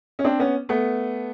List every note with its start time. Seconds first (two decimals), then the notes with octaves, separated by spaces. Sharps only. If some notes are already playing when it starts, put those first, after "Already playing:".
0.19 C#4
0.24 C4 D4
0.39 B3 C#4
0.69 A3 B3